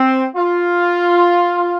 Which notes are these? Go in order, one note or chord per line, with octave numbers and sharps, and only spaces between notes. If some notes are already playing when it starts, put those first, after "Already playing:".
Already playing: C4
F4